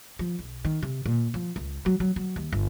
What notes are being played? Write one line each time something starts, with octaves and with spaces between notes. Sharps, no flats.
F3
B1
D#3
C3
A#2
F3
C#2
F#3
F#3
F#3
D#2
G1